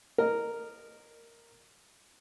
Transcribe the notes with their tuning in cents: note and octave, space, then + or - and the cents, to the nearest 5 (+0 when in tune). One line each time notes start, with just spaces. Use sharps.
A#4 -5 D#5 -35